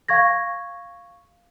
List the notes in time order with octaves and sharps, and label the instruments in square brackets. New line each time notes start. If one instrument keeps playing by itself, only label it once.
[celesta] F5 C#6 G#6 A#6